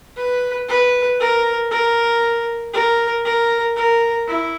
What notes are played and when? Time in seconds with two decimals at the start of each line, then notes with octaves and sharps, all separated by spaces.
0.17 B4
0.68 B4
1.20 A#4
1.71 A#4
2.74 A#4
3.25 A#4
3.77 A#4
4.27 E4